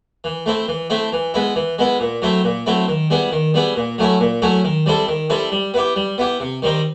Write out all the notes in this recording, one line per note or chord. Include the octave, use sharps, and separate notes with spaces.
E3
A3 C4 E4
E3
A3 C4 E4
E3
G#3 B3 E4
E3
G#3 B3 E4
A#2
F#3 A3 C4 E4
A#2
F#3 A3 C4 E4
D#3
G3 B3 E4 G#4
D#3
G3 B3 E4 G#4
A#2
F#3 A3 C#4 E4
A#2
F#3 A3 C#4 E4
D#3
G3 C4 E4 A4
D#3
G3 C4 E4 A4
G3
B3 E4 G4
G3
B3 E4 G4
C3
D#3 G3 C4 D#4